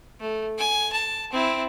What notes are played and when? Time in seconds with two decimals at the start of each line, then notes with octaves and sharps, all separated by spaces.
0.20 A3
0.59 G#5
0.93 A5
1.32 C4 E4